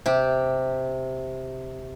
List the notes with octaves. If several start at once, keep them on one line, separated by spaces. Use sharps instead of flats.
C3 G4